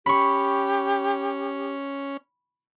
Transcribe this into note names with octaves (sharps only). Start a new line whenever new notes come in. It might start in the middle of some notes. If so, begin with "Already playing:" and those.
C#4 G4 B5 C#6